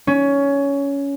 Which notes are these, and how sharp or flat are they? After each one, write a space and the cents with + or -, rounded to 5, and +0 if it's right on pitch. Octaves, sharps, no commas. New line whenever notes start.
C#4 +15